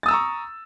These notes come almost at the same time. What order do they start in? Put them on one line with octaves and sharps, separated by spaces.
A6 D#6 E6 A#5 C#6